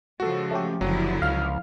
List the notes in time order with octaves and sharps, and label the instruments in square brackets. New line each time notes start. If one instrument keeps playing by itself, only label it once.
[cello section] C#3 F3 G#3 [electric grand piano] F#4 A4
[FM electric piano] A3 C#4 G4
[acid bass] F#1 [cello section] D3 F3 E4 [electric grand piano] F#3
[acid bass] C#2 [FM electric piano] F5 F6